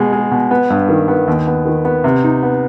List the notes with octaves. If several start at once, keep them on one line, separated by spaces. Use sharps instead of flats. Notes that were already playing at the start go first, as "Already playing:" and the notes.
Already playing: B2 G#3
G#3
B2
B3
G2
D#3
B3
D#2
B3
D#3
B3
C3
D#4
B3